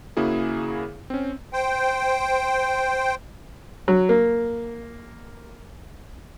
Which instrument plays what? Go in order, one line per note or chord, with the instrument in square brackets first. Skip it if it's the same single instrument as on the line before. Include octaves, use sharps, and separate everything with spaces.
[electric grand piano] C#3 A#3 E4 F#4 G#4
C4 C#4
[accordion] C5 G5
[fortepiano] F#3
A#3